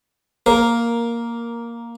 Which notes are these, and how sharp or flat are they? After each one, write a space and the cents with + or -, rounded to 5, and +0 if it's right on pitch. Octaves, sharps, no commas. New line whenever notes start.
A#3 +0 A#4 +10